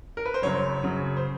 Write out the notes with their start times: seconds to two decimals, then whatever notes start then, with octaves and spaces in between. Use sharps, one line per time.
0.17 A#4
0.25 B4
0.34 C5
0.42 F#2 C#3 F#3 C#5
0.83 F#2 C#3 F#3
1.17 C5